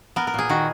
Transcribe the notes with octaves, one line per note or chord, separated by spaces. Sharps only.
B3 A#4
A#4
A#2 G#4
D#3 F#4